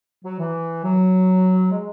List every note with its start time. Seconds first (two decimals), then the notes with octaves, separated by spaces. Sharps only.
0.25 F#3
0.40 E3
0.84 F#3
1.72 G#3